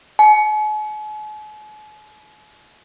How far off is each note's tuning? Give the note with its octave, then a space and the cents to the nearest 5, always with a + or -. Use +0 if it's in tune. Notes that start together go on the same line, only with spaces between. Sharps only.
G#5 +45